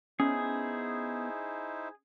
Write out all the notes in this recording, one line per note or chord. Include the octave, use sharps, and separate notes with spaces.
B3 C#4 D#4 E4 G#4 C5